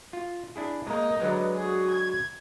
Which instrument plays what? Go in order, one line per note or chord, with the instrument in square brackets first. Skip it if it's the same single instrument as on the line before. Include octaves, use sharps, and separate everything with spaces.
[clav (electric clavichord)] F4
D4 E4 G#4
[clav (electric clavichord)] G#3 A#3 [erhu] D#4
[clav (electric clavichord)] D3 F#3 G#3 [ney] B4
[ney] F#4 [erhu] G#4
[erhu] G#6